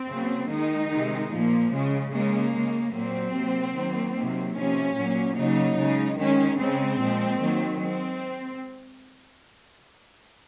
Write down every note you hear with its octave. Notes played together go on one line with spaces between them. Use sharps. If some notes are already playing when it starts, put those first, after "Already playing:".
Already playing: C4
C#3 F#3 A#3
D#3 G#3 D#4
C3 D#3 G#3
A#2 F3 A#3
C#3 G#3
C#3 G#3 A#3
C#3 G#3
A#2 F#3 A#3 C4
C3 F#3 A#3
D#3 F#3 A#3
C3 D#3 F#3 A#3
C3 F3 A#3 C#4
A#2 F#3 A#3
C#3 F#3 A#3 D#4
C#3 G#3
D#3 G#3 C#4
C#3 G#3 C4
A#2 F3 G#3
D#3 F#3 A#3
G#3 C4